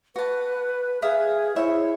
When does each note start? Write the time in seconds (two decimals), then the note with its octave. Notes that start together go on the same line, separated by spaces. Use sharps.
0.16 F#4 B4 A5
1.02 G#4 E5 F5 D#6
1.56 E4 C5 C#5 E5